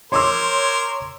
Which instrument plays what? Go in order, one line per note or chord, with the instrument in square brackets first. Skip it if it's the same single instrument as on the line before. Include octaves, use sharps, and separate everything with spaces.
[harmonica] A#4 C5 [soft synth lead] C#5 [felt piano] C6 D6 E6